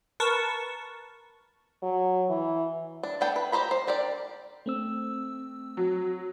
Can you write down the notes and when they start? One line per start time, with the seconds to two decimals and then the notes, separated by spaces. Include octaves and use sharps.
0.20 A#4 B4 A5 C#6
1.83 F#3
2.30 E3
3.03 D4
3.21 A3 B3 D4 G5
3.36 B4
3.52 G4 C5 A#5 B5
3.71 C5
3.87 D4 G4 A#4 D5
4.66 A3 C4 E6
5.77 F#3